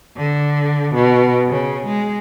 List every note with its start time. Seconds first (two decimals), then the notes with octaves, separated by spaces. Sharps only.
0.17 D3
0.95 B2
1.49 C#3
1.86 G#3